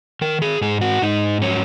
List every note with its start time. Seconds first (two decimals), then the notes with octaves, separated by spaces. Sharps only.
0.21 D#3 A#4
0.42 G#4
0.61 G#2 G#4
0.81 F#4
1.02 G#2 D#4
1.41 F#3 C#4